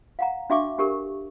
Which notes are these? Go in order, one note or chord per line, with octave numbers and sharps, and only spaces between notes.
F5 F#5 A#5
D4 F#4 E5 F5 C#6 D6
D4 G4 A4 A#4 C#6